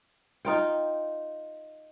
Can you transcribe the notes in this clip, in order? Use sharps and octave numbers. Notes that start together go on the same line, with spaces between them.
D#4 F4 G5